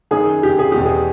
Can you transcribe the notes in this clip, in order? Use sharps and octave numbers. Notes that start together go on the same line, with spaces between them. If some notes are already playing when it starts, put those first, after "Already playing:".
F#2 D#3 G#4
G4
G#4
E2 B2 G4
G#4